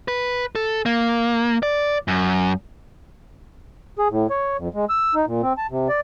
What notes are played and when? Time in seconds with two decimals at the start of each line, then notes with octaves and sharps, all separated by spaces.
0.08 B4
0.55 A4
0.86 A#3
1.63 D5
2.08 F#2
3.99 G#4
4.11 A2
4.30 C#5
4.58 F2
4.74 G#3
4.90 E6
5.15 D#4
5.27 A#2
5.42 C4
5.58 A5
5.71 C3
5.89 D5